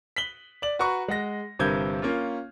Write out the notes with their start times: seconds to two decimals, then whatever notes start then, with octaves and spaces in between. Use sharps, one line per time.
0.16 B6 F#7 G7
0.62 D5 F#7
0.79 F#4 B4 A#5 C#6
1.08 G#3 F#5 A#6
1.59 G1 G2 C3 A#4 G6 G#6
2.02 A#3 C#4 F4